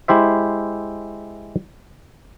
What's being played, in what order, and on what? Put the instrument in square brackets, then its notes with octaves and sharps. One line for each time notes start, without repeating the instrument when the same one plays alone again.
[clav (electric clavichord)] G#3 E4 G4 C5 E5